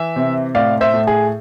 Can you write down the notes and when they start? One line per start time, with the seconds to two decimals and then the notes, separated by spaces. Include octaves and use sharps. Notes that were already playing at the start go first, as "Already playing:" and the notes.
Already playing: E3 E5
0.16 C3
0.55 A2 D5 F5
0.81 C5 E5
0.94 A2
1.07 G#4